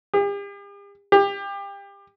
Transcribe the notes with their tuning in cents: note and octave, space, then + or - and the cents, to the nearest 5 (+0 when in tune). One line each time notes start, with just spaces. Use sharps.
G4 +45
G4 +30